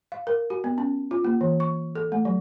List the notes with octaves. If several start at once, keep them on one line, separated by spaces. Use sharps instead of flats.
F5
A#4
F#4
B3
C#4
F4
A#3
E3
C#6
A4
A3
F#3